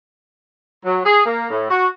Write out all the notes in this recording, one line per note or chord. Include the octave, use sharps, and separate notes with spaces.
F#3
G#4
A#3
A2
F#4